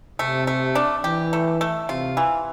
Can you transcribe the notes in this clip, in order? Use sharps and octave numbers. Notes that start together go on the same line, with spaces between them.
C3 A3
A3
D4
E3 G4
A3
A3
C3 F4
E3